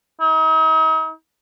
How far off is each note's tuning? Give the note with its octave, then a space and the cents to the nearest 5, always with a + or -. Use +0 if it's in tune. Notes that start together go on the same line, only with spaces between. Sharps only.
D#4 +40